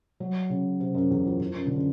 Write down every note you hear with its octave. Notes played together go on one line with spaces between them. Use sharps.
F#3
C#3
C3
F#2
E2
F2
F2
F#2
D3
C#3